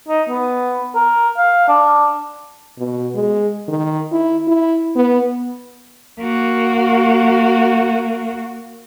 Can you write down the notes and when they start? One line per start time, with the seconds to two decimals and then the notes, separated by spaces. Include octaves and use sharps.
0.08 D#4
0.29 B3
0.95 A#4
1.38 F5
1.69 D4
2.78 B2
3.15 G#3
3.68 D#3
4.12 E4
4.47 E4
4.96 B3
6.19 A#3 F#4